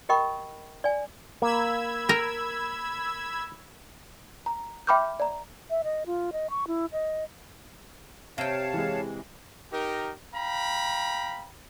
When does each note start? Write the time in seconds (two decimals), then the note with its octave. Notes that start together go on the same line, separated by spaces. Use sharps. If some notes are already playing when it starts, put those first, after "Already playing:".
0.09 G4 A#4 D#5 G5 B5 C#6
0.84 D5 G#5
1.42 A#3 B5 E6 G#6
2.09 A#4 G5
4.46 A#5
4.87 E5 G5 B5 D6 F6 G6
5.20 D5 A#5
5.70 E5
5.84 D#5
6.06 F4
6.33 D#5
6.50 C#6
6.67 E4
6.92 D#5
8.38 C3 C#5 F5 G5 A5
8.74 E3 G#3
9.73 D#4 G4 A#4
10.35 F5 G5 A#5 B5